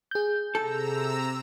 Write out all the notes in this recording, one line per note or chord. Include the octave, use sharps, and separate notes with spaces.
G#4 G6
C3 A4 A#5 E6